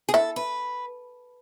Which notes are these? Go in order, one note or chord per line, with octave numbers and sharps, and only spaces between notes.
G#4
E4 A4
B4